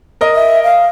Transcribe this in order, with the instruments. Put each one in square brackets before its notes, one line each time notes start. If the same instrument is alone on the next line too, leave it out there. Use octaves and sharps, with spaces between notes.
[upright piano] A#4 D#5
[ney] E5
F5